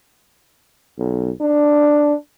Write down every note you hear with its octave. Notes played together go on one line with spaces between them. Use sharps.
B1
D4